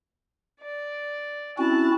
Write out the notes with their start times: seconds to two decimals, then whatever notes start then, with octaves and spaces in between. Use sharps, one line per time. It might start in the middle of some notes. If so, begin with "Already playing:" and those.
0.61 D5
1.58 C4 C#4 E4 F#4 A5 F#6